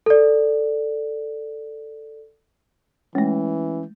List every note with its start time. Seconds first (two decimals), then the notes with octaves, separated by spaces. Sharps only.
0.06 A4 D5
3.15 E3 G#3 A3 C#4